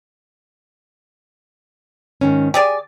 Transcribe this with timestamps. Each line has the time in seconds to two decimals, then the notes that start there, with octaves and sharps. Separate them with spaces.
2.21 G#2 D#3 C#4
2.54 G4 G#4 D5 G#5